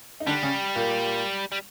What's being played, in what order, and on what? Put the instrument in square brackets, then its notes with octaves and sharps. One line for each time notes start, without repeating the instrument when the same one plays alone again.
[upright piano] D#4
[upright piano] D3 D4 [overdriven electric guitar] G3
[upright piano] C#3 C#4
A#2 A#3
[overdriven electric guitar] G3